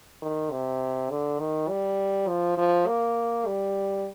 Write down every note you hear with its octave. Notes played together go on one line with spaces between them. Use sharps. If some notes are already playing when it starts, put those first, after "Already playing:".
D#3
C3
D3
D#3
G3
F3
F3
A#3
G3